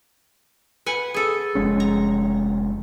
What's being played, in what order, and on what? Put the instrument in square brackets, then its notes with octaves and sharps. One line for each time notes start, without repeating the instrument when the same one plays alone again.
[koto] B4 F#5 G#5
G#4 A4
[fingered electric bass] F1 G#3 C#4
[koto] A#5